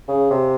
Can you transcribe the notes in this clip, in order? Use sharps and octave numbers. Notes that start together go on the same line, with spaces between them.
C#3
C3